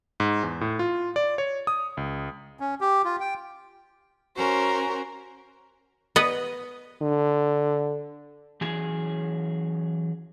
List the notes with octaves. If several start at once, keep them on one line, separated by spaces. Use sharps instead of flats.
G#2
E2
A2
F4
D5
C#5
D#6
C#2
C#4
G4
F4
G5
C#4 F#4 A#4 C5
B3 B4 D#5
D3
E3 F#3 C#4 G#4 G#5